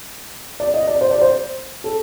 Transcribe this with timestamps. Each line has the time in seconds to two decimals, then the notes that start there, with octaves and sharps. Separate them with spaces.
0.60 D5
0.74 D#5
0.87 D5
1.01 C5
1.11 D5
1.22 C5
1.84 A4